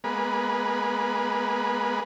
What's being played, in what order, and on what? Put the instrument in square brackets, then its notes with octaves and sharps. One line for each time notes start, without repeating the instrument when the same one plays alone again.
[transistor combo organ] G#3 A#3 B3 B4